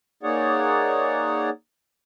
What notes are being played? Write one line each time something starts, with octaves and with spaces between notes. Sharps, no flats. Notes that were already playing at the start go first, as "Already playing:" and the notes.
A#3 D#4 G#4 C#5 D5 F#5